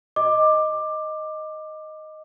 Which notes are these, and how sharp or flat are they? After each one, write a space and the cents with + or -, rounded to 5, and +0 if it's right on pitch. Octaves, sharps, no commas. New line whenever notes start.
D#5 +0 D6 +15